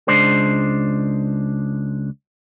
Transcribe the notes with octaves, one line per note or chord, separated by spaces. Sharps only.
C#2 G#3 D4 C5